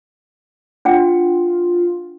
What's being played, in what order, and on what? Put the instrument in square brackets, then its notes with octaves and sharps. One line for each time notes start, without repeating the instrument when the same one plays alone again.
[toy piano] D4 F#5 G5 [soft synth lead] F4